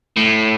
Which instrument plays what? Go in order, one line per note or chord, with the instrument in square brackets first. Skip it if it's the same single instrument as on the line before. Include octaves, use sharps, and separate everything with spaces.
[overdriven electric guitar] A2